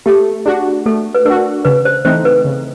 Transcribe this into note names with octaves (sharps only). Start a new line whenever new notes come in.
A3 G4
D4 F#4 G#4
A3 A4
B4
D4 F#4 A#4
C#3 B4
C5
E3 A3 C4 D#4 C5
B4
C#3